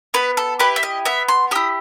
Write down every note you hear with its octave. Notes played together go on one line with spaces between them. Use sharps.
B3 B4
A4
E4 G4 B4
E5
D#5
B3 E5
C6
E4 G4 D#6